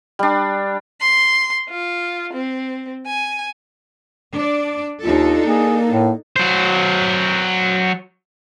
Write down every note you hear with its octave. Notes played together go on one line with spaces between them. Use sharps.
G3 D4
C6
F4
C4
G#5
D4 D5
D#2 D4 D#4 F4 A4
A#3 G#4
A2
F#3 C5